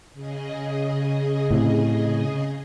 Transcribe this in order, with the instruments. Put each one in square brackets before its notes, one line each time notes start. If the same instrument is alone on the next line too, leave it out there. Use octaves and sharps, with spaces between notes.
[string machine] C#3 G#4 D#5
[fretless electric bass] A2 C3